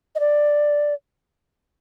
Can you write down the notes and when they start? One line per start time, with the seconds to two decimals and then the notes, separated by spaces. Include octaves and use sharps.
0.15 D#5
0.20 D5